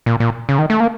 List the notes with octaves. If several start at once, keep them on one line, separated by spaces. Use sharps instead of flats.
A#2
A#2
C#3
D#3
A3
A#3